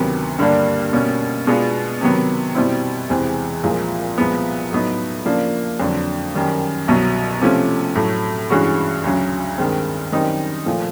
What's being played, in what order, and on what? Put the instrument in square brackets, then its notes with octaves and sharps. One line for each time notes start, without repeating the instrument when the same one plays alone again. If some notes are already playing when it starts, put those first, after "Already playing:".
Already playing: [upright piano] D2 C3 D#3 F#3 B3
G2 D3 G3 A#3 D4
B2 G3 A#3 C#4
B2 G#3 B3 D4 F4
C3 D#3 F#3 B3
B2 G3 C4 E4
E2 C3 E3 G#3 C4
C2 A#2 F3 G#3
C2 A#2 F3 G#3 B3
A2 F#3 B3 D#4
C#3 F3 A#3 D4
F2 D3 F#3
F#2 D#3 G3
C2 B2 F#3
C3 F3 A3 C#4
A2 F#3 A3
G2 E3 G#3 C#4 F#4
D2 C#3 F#3
G2 D#3 G#3 C4
F#2 D#3 G3 C4 D#4
A#2 F3 A3